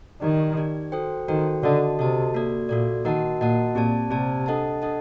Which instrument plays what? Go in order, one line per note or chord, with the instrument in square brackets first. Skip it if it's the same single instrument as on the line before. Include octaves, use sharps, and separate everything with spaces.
[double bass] D#3 [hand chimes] D#4 G4 D5
[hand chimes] D#4 G4 D5
F#4 A4 C5 G5
[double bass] D#3 [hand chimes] F#4 A4 C5 G5
[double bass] D3 [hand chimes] F#4 A4 D#5 A5
[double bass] C3 [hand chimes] F#4 A4 D#5 A5
[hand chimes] A#3 F#4 A4 D5
[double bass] A#2 [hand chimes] A#3 F#4 A4 D5
[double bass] D#3 [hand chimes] F#4 A#4 D#5 F#5 A5
[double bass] A#2 [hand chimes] F#4 A#4 D#5 F#5 A5
[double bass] A#2 [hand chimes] C4 G4 D5 A5
[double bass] C3 [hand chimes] C4 G4 D5 A5
[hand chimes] D4 A4 D#5 F#5 A5
D4 A4 D#5 F#5 A5